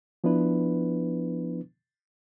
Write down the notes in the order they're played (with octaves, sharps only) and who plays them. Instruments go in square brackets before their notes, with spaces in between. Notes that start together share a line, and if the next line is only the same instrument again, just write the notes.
[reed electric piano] F3 B3 D4 E4 B4